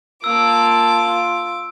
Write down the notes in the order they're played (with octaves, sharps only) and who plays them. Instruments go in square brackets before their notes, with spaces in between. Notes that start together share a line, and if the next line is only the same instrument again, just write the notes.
[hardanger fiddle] A#3 A5 [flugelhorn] F4 [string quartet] D6 [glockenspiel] E6